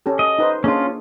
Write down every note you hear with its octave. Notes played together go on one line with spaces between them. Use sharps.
C#4 G4 A4
D#5
D#4 B4 C5
A#3 C#4 D4 F4 G#4